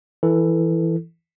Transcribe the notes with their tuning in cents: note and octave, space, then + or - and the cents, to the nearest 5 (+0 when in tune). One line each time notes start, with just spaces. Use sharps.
E3 +0 E4 +0 A4 +10